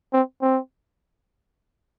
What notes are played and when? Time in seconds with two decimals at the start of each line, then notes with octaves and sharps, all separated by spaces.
0.13 C4
0.42 C4